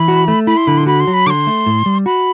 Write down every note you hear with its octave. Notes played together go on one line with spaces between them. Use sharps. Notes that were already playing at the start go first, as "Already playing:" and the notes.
Already playing: E3 B5
F#4
A3
E4 B5
C6
D3 B5
C6
F#4 B5
C6
F#3
B5
D3 C6 D6
A3
A2
G3
F#4 B5